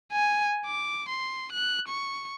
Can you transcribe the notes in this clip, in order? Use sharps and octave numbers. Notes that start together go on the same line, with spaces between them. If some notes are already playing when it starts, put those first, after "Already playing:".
G#5
D6
C6
F#6
C#6